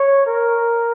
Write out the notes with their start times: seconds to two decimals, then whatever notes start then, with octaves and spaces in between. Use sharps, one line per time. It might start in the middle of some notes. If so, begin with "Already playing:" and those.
Already playing: C#5
0.26 A#4